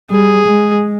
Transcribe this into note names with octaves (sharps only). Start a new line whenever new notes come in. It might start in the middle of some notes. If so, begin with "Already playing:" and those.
G3 G#4
G#3